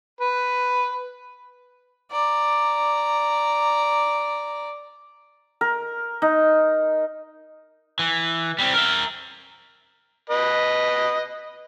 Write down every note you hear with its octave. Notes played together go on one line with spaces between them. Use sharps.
B4
D5 A#5
A#4
D#4
E3
G3 C4
A#4 E5
B4 D#5